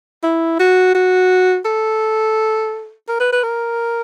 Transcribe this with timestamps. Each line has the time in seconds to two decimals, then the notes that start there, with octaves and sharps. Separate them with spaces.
0.23 E4
0.60 F#4
0.95 F#4
1.65 A4
3.08 A#4
3.20 B4
3.33 B4
3.43 A#4